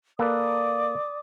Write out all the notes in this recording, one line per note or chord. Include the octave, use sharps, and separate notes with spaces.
A#3 A4 B4 D5 D6 D#6